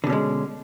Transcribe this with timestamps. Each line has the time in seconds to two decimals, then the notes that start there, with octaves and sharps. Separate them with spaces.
0.04 D3
0.07 B2
0.10 C#4
0.12 G#3